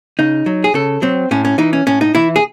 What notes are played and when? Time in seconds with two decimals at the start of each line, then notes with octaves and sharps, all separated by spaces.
0.19 C#3 D#4
0.46 F#3
0.64 G#4
0.74 C#3 A4
1.02 F#3 C4
1.31 A2 C#4
1.45 C#4
1.58 E3 D#4
1.73 C#4
1.87 A2 C#4
2.01 D#4
2.15 E3 E4
2.36 G#4